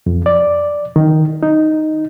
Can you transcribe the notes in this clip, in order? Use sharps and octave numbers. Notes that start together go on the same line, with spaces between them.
F2
D5
D#3
D#4